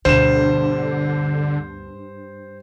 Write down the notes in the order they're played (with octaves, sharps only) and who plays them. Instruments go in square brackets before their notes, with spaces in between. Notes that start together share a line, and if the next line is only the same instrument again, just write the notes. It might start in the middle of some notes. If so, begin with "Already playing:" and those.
[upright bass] D2 B2 [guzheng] G2 [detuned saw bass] D3 [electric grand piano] C5 E7